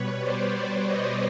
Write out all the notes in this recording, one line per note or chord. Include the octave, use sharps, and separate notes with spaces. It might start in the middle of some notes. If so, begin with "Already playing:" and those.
Already playing: B2 G3 B4 C#5
C5 D5
C5 D5
C#5 D#5